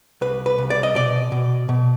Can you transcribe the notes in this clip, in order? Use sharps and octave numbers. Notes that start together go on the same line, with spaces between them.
C2 B4
B4
C2
D5
D#5
B2 D5
B2
B2